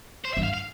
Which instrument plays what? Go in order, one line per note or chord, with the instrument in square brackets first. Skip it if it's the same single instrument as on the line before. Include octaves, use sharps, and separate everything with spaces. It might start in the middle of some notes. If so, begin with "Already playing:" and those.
[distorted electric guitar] C5
E5
[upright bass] G2
[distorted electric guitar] F5
F5